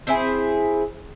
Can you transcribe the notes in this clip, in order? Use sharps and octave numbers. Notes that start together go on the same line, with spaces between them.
C4 E4 G#4